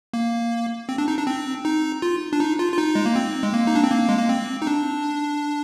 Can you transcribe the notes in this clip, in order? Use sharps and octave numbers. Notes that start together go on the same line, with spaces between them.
A#3
C4
D4
D#4
D4
C4
D#4
F4
D4
D#4
F4
F4
D#4
G#3
A#3
C4
G#3
A#3
D#4
D4
C4
A#3
G#3
A#3
C4
D#4
D4